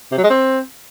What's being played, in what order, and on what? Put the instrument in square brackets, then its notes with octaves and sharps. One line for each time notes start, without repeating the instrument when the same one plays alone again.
[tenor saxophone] C3
F#3
G#3
C4